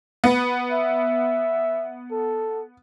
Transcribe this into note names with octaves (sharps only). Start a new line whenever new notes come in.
B3
E5
A4